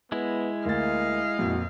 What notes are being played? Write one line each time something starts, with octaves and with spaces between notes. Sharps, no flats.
G#3 B3 E4
D2 A#3 D#5 F5 A6
F2 A#2 F#4